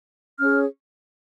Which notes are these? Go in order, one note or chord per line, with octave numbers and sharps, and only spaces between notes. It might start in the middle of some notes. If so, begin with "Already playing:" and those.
C#4 G#4 C#5 F6